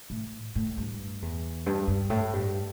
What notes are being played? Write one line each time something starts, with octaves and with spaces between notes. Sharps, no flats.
A2
A2
G2
E2
G2
G2
A2
G2